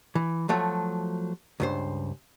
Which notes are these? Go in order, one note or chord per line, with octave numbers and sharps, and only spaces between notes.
E3
F3 F#3 A3
C#2 G2 C5